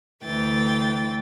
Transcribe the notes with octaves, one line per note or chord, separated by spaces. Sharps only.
D2 E3 G5 A6